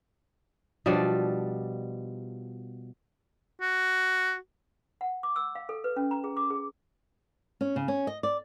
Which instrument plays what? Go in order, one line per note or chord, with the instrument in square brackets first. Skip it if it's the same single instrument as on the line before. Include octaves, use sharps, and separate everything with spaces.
[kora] B2 F3 G3 D4
[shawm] F#4
[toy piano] F#5
D6
E6
F5
A4
B4
C#4
A#5
G#4
D6
G#4
[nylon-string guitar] C#4
C#3
C#4
D#5
D5